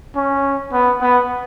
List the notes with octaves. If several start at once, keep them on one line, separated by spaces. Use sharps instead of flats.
C#4
B3
B3